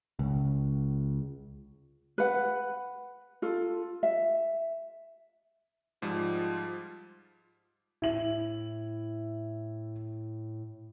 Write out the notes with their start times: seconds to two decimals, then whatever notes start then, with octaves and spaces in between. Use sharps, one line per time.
0.19 C#2
2.18 B4 F#5
3.42 F4 A4
4.03 E5
6.02 G#2 F3 G3 F4
8.02 A2 E4 F#7